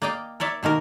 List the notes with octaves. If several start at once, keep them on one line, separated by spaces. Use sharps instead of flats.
A#3 D5 D#5 F5 G5
A#4 C#5 D5 E5
B2 D#3 A#3 A#4